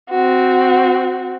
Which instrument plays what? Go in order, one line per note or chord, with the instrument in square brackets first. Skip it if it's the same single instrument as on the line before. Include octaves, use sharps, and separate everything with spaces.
[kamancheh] C4 F#4